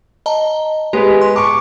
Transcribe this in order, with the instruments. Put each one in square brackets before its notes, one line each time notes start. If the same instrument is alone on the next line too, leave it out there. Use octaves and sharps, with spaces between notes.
[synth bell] D#5 A5 A#5
[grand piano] G#3 B3 B4 [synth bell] G4
[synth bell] C6
[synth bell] A5 [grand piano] C#6 D6